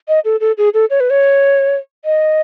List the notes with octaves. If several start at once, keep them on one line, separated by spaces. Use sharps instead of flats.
D#5
A4
A4
G#4
A4
C#5
B4
C#5
D#5